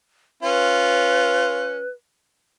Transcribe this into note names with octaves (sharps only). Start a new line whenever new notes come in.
C#4 F4 B4